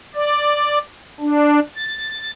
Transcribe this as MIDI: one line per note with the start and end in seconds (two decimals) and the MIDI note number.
0.14 0.78 74
1.20 1.59 62
1.75 2.31 93